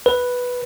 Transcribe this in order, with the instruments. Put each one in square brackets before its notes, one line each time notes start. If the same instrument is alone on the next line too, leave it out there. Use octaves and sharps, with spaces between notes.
[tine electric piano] B4